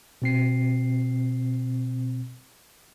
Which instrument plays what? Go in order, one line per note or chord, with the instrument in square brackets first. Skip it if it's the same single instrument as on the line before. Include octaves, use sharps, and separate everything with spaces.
[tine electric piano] B2 C4 C7